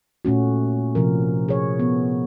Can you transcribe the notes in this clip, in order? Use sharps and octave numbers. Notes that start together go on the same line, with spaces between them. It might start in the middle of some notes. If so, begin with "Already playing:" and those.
A#2 A3 C#4 F#4
C3 F3 A#4
G#4 C#5
B3